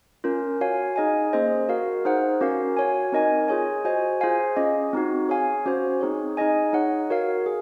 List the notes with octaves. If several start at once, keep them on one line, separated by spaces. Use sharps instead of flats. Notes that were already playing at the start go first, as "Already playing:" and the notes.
C#4 F4 A#4
F#4 C#5 F5 G#5
D#4 G#4 D#5 G#5
A#3 C#4 G#4 C5 D#5
F#4 A#4 F5
D#4 G#4 C5 F#5
C#4 F#4 A#4 F5
F#4 C#5 G#5
C4 D#4 A#4 D#5 G#5
F4 G#4 C#5 G#5
F#4 C5 D#5 G#5
F4 G#4 C5 F5 G#5
C#4 F4 G#4 D#5
C4 D#4 F#4
G#4 C#5 F5 G#5
C#4 F#4 C5
C4 D#4 G#4 C#5
D#4 G#4 D#5 G#5
D#4 G#4 C#5 F#5
F#4 A#4 C#5 F5
G#4